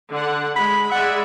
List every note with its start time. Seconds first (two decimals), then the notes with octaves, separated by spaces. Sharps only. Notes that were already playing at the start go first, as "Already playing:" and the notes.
0.11 D3 F#5
0.56 G#3 B5
0.91 G#3 D5 E5 F#5